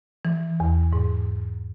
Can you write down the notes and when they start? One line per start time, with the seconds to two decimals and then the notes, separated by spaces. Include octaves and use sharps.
0.25 E3
0.60 E2
0.93 G#2